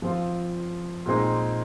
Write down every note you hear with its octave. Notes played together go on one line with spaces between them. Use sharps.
F3 C4 F4
A#2 G#3 C4 D#4